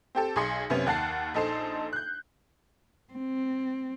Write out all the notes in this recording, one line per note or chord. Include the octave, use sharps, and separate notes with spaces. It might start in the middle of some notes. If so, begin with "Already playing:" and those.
C4 G4 A4
B1 G#4 C6 C#7
F#2 C3 B3 C#4
D#2 F#5 A5 C7
A#1 D#4 A4 C5 C7
F#6 G6
C4